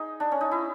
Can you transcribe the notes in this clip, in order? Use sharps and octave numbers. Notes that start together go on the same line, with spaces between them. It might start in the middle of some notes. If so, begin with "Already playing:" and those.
Already playing: D#4 G#4
D4
C#4
D#4
E4